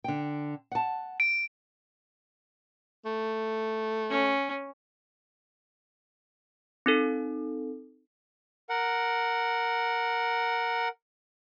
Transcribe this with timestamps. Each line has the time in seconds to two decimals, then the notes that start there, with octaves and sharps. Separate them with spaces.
0.04 D3 G5
0.71 F#5 A5
1.20 D7
3.05 A3
4.09 C#4
6.86 C4 D#4 A4
8.69 A#4 F#5